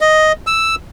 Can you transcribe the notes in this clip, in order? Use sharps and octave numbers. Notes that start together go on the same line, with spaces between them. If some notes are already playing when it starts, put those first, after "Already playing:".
D#5
E6